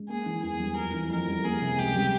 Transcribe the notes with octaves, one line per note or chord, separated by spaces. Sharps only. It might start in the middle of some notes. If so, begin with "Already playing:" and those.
Already playing: G#3
A#3 G#4
E3
E2 G#4
G3
F2 A#4
E3
F2 A#4
G3
A#3 G#4
C3
C#2 G4
G3